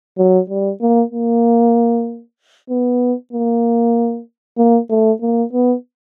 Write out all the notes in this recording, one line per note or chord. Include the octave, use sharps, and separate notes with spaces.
F#3
G3
A#3
A#3
B3
A#3
A#3
A3
A#3
B3